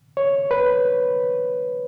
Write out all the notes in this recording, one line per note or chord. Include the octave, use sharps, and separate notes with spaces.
C#5
B4